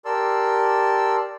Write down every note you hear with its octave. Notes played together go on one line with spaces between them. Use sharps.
G4 A#4 D5 A5 C6 E6